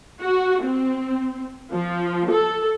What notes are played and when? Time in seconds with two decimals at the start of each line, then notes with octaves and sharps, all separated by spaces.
0.22 F#4
0.64 C4
1.73 F3
2.30 A4